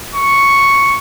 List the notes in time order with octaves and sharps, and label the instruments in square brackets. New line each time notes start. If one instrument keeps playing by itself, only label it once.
[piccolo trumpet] C#6